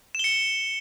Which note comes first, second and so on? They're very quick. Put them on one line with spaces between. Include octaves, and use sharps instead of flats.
E7 G7 C#7